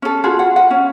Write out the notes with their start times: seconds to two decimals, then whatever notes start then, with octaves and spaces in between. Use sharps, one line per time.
0.02 C#4 A4
0.24 F4 F#4 G#4 B5
0.39 F#5
0.56 F#5
0.71 C#4